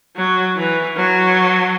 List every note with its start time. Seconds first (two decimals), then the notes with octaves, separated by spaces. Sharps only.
0.16 F#3
0.56 E3
0.97 F#3